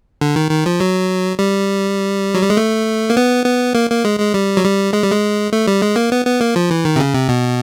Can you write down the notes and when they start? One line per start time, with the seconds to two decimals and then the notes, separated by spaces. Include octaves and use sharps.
0.21 D3
0.36 D#3
0.51 D#3
0.66 F3
0.80 F#3
1.39 G3
2.34 F#3
2.42 G3
2.50 G#3
2.57 A3
3.10 A#3
3.17 B3
3.46 B3
3.75 A#3
3.90 A#3
4.05 G#3
4.20 G#3
4.34 G3
4.57 F#3
4.64 G3
4.93 G#3
5.02 G3
5.11 G#3
5.53 A3
5.67 G3
5.82 G#3
5.96 A#3
6.12 B3
6.26 B3
6.41 A#3
6.56 F3
6.71 E3
6.85 D#3
6.96 C3
7.00 C#3
7.14 C3
7.29 B2